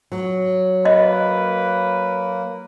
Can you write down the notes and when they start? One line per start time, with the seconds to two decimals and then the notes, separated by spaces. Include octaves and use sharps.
0.12 F#3
0.85 A#3 B4 D#5